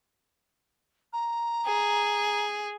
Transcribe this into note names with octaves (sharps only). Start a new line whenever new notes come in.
A#5
G#4